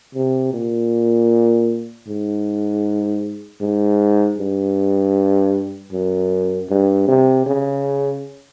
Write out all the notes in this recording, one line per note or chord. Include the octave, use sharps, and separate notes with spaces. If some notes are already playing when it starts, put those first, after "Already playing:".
C3
A#2
G#2
G#2
G2
F#2
G2
C3
C#3